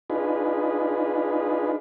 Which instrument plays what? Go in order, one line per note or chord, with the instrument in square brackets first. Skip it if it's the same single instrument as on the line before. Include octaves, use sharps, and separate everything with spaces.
[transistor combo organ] D4 D#4 F4 G#4 B4